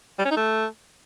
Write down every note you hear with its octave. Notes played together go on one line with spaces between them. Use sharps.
G3
C#4
D#4
A3